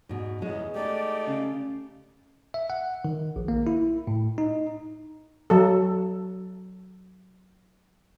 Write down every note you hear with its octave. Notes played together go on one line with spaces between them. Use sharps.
G#2 B2
E2 C#3 G#3
A3 D#4 G4 D5
C#3
E5
F#5
D#3
A#1
A#3
E4
A2
D#4
F#3 A4